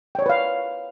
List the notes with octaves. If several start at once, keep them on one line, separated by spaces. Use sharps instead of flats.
B4 C#5 D5 F5 G5